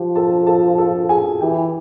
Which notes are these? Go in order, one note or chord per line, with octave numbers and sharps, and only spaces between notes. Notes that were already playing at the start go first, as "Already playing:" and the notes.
Already playing: F3 G4
A4 A5
A4 A5
A4 A5
G#4 G#5
E3 G4 G5